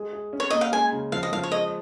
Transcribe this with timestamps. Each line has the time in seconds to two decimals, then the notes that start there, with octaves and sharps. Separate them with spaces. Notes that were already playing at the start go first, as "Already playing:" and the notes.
Already playing: G#3 G#4
0.13 G#4
0.33 C#4
0.40 C#5
0.50 A#3 D#5
0.61 F5
0.72 G#3 G#5
0.92 C#3
1.12 F3 F5
1.23 D#5
1.33 F3 F5
1.43 C#5
1.52 G#3 D#5